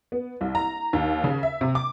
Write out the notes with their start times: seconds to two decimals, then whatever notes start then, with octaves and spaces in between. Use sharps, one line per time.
0.12 B3
0.41 C2
0.55 A#5
0.93 D#2
1.24 C#3
1.43 E5
1.61 C3
1.75 D6